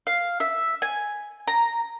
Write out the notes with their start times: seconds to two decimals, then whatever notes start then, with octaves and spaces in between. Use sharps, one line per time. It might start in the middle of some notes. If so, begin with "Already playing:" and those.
0.07 F5
0.40 E5
0.82 G#5
1.48 A#5